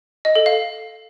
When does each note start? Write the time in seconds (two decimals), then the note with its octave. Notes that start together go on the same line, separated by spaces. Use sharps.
0.25 D#5
0.35 A4
0.46 F5